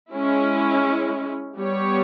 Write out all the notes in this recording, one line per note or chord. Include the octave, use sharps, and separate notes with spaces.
G#3 C#4 E4
G3 B3 G4 C#5